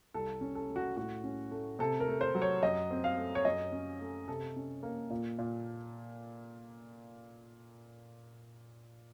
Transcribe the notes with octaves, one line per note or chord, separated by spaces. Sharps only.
C2 A4
C#4
A4
A3
F#4
A2 F#4
C#4
A3
C3 A4
A#4
A3
C5
F#3
C#5
F#2 D#5
C4
F5
A3
C#5
F#2 D#5
C#4
A3
C3 A4
C#4
A#3
A#2
A#2